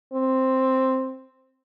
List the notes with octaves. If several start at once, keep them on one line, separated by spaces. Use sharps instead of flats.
C4